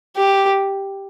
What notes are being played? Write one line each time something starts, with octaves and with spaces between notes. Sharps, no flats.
G4